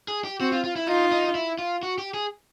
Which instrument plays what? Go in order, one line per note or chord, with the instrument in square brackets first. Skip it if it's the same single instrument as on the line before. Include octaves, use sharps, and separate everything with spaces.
[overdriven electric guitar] G#4
G4
[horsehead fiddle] C4 [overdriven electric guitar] F#4
[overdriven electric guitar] F4
F4
E4
[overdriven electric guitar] D#4 [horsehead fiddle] F4
[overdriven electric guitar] D#4
E4
F4
F#4
G4
G#4